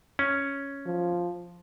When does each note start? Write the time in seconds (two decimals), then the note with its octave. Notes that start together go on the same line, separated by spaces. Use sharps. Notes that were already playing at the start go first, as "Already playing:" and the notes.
0.19 C#4
0.86 F3